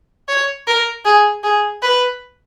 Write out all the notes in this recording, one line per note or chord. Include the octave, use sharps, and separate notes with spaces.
C#5
A#4
G#4
G#4
B4